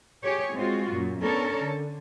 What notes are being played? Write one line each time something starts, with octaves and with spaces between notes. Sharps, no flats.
G4 G#4 C#5
G#3 C4 F4 F#4
F#2 A#2
B3 C#4 D4 A4 A#4 C#5
D3